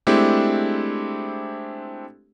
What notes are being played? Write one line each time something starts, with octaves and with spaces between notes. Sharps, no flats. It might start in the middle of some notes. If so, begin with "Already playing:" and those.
G#3 A3 C4 D4 E4 G4